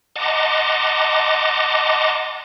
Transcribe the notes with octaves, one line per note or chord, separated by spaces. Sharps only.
D#5 F#5 A5 A#5 C6 D6